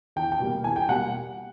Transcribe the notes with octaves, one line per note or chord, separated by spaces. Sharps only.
E2 G5
G5
B2 G3 A#3
E2 G#5
G5
B2 G3 A#3 F#5